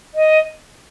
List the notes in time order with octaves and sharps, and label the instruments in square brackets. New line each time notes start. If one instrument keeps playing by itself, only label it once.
[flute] D#5